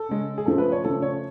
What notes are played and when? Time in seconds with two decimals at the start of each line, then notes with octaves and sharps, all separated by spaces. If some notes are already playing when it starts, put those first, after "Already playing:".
Already playing: A4
0.09 C#3 G#3 C#4
0.38 G#4
0.46 C#3 F3 A3 A4
0.58 B4
0.72 C#5
0.84 C#3 F3 A3 A4
1.02 C#5